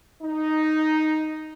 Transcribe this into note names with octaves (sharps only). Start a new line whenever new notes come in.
D#4